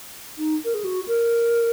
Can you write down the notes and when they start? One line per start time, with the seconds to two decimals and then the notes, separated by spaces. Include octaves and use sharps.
0.38 D#4
0.65 A#4
0.74 G#4
0.84 F#4
1.08 A#4